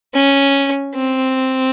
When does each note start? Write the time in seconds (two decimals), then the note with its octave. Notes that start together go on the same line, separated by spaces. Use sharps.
0.13 C#4
0.95 C4